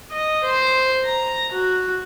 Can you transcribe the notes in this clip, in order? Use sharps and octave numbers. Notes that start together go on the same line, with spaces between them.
D#5
C5
A#5
F#4